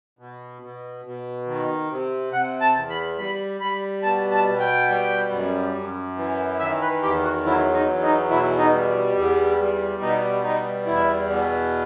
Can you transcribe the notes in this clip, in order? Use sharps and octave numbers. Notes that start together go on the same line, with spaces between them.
B2
B2
B2
D#3
C3
C3 F#5
A5
E2
B5
G3 B5
G3 B5
B2 A5
A5
B2
G5
G3
F#2
F#2
E3
D#3 E5
B4
E2 G4
F#4
F#3 E4
D#4
E2
D#4
B2 E4
D#4
G3
E2
G3
B2 D#4
G3 D#4
E2 E4
B2